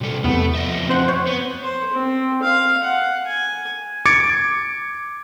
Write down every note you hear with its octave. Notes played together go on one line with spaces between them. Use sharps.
C3 G3 A4
E2 C3 A3 B3
F2 D#5 E5
C4 C5 F#5
C5 C#5
B3
C5
C4
F5
F#5
G#5
D6 G#6 A6 C#7 D7